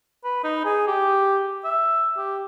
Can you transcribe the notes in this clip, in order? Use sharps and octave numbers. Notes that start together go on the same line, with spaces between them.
B4
D#4
G#4
G4
E5
G4